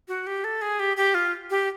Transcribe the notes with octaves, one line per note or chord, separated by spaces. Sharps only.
F#4
G4
A4
G#4
G4
G4
F4
G4